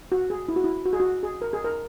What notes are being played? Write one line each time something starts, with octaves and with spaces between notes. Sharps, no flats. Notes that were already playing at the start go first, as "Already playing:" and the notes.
F#4
G#4
E4
F#4
E4
F#4
G#4
F#4
G#4
A#4
G#4
A#4